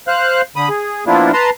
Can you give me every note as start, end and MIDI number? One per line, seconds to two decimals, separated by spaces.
0.08 0.42 72
0.08 0.42 77
0.08 0.42 90
0.56 0.69 50
0.56 0.69 83
0.56 0.69 87
0.69 1.04 68
1.07 1.31 53
1.07 1.31 58
1.07 1.31 59
1.07 1.31 62
1.07 1.31 64
1.07 1.31 65
1.33 1.50 71
1.33 1.50 81
1.33 1.50 82
1.33 1.50 84